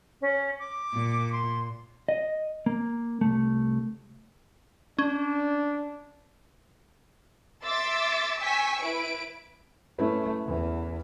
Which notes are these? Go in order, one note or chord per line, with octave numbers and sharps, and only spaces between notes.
C#4
D6
A#2
C6
D#5
A#3
C2 G#2 A3
C#4 D4
E5 C6 D6 E6 A6
G5 G#5 C#6 E6 B6
E4 B4 D7
A3 C#4 E4 B4
E2 E3